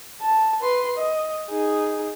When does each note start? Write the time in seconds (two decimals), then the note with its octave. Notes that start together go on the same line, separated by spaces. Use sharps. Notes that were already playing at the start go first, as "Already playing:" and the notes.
0.21 A5
0.61 B4 C6
0.97 D#5
1.50 D#4 G#4